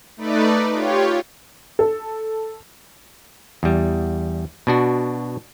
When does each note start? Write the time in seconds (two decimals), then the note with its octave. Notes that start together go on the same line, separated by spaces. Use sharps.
0.17 A3 D#4 B4 D5
0.73 F4 G4 C#5
1.79 A4
3.63 E2 G3
4.67 B2 D4 F#4